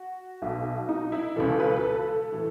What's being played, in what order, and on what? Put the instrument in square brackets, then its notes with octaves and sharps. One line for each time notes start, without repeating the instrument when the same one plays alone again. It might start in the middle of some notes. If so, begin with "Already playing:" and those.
Already playing: [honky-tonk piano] F#4
B1 B2
D#4
E4
C#2 C#3 E3 A4
B4
B4
A4
A2 E3